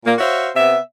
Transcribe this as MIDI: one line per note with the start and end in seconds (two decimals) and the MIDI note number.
0.05 0.15 46
0.05 0.15 58
0.19 0.49 66
0.19 0.49 72
0.19 0.49 73
0.19 0.49 76
0.19 0.49 77
0.56 0.77 48
0.56 0.77 59
0.56 0.77 76